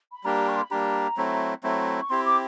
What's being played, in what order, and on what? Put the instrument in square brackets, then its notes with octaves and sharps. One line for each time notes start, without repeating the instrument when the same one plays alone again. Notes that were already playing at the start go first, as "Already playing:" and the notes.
[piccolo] B5
[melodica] G3 A#3 D4 G4 [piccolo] A#5
[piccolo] C#6
C6
B5
[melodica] G3 A#3 D4 G4 [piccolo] A#5
[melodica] F#3 A3 C4 E4
F#3 A3 C4 E4
[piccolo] C#6
[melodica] C4 E4 G4 [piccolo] C6
[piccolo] D6